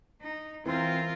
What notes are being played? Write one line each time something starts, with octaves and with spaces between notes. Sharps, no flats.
D#4
E3 C4 F4 A#4